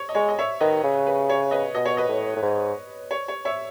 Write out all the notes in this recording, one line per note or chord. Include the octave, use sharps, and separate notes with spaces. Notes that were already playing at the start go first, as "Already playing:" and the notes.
Already playing: C#5
D#5
G#3 C#5
D#5
C#5 E5
D#3 B4 D#5
C#3
B4
C#5
B4 D#5
B2 D#5
C#5
B4 D#5
A2
A2
G#2
C#5
C#5
C#5 E5